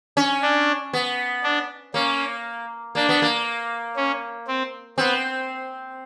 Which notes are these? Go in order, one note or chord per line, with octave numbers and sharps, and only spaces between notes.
C#4
D4
B3
D4
A#3 C#4
A#3 D4
B3
A#3
C#4
C4
B3 C4